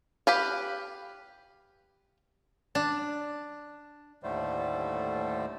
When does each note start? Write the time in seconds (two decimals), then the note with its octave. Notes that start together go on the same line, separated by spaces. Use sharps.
0.27 G4 B4 F5
2.75 D4
4.23 D#2 A2 D3 G3 A3 C5